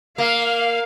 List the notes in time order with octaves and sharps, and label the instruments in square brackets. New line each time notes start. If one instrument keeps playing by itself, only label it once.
[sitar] A#3 [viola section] F5